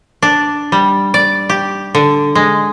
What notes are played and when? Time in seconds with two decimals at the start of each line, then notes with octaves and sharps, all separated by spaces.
0.23 D4
0.72 G3
1.14 D5
1.49 G4
1.95 D3
2.35 G#3